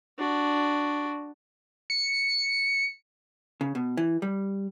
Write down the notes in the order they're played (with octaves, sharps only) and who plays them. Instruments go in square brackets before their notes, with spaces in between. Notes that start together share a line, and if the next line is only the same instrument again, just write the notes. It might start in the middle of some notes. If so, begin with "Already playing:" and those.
[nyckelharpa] D4 F#4
[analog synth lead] C#7
[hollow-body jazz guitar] C#3
B2
E3
G3